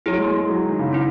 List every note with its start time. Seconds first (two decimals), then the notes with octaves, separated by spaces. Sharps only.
0.06 F#3 E4 G#4 C#5
0.17 G#3
0.28 G#3
0.38 G#3
0.49 F#3
0.64 D#3
0.79 C#3
0.93 C#4 E4